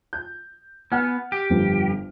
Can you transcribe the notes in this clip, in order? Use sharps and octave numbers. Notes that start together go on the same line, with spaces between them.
G6
B3 F#5 G#5 F6
G4
G1 F2